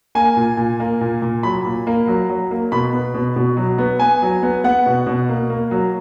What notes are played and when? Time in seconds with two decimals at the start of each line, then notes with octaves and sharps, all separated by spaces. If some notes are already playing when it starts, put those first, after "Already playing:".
0.15 A#3 G#5
0.36 A#2
0.57 A#2
0.80 A#3
1.01 A#2
1.22 A#2
1.43 F#3 B5
1.65 A#2
1.87 A#3
2.07 F#3
2.29 F#3
2.51 A#3
2.72 B2 B5
2.93 B3
3.14 B2
3.36 B2
3.57 F#3
3.78 B3
4.00 B3 G#5
4.22 F#3
4.43 B3
4.64 B3 F#5
4.86 B2
5.06 B2
5.29 A#3
5.50 A#3
5.71 F#3